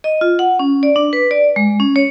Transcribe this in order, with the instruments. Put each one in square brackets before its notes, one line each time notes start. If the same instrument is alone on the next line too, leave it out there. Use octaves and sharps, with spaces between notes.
[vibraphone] D#5
F4
F#5
C#4
D5
D4
B4
D5
G#3
C#4
C#5